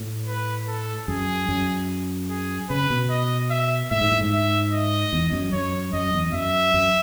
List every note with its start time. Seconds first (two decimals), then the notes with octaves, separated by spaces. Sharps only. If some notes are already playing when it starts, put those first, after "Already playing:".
Already playing: A2
0.27 B4
0.68 A4
1.08 F#2 G#4
1.49 F#2
2.30 G#4
2.70 C#3 B4
2.90 B2
3.10 D#5
3.51 E5
3.91 A2 E5
4.01 G#2
4.12 A2
4.21 G#2
4.32 E5
4.72 D#5
5.13 E2
5.33 F#2
5.53 F#2 C#5
5.93 F#2 D#5
6.14 E2
6.33 F#2 E5
6.74 F#2